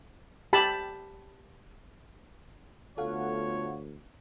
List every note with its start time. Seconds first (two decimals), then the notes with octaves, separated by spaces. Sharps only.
0.53 G4 A5 B5
2.98 D2 A3 B3 F4 A4 C#5 F5 F#5